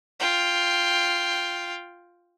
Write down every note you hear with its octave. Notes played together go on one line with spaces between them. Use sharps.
F4 G5